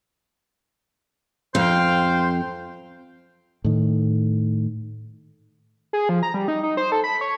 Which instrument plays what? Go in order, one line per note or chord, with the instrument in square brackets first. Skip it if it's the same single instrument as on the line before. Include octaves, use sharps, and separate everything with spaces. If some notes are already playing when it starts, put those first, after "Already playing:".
[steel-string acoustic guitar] F2 [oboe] C5 [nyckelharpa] F5 G5
[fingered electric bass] A2 D#3
[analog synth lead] G#4
F3
A#5
G3
D#4
D#4
C5
A4
B5
C#5